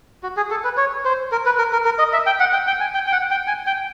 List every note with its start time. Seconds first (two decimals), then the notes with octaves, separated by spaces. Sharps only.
0.23 F#4
0.37 G#4
0.51 A4
0.64 B4
0.77 C#5
1.05 C5
1.32 A#4
1.46 B4
1.58 A#4
1.73 A#4
1.85 A#4
1.99 D#5
2.13 E5
2.26 G5
2.40 F#5
2.53 G5
2.67 G5
2.80 G#5
2.94 G5
3.07 G5
3.12 F#5
3.31 G5
3.47 G#5
3.67 G5